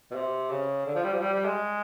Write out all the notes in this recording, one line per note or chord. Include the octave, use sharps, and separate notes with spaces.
B2
C3
C#3
D3
F3
G3
F3
G3
G3
G#3